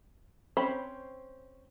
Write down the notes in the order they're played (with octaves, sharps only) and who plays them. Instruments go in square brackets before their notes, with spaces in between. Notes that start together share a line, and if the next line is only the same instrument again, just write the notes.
[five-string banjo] C4 C#4 C5 B5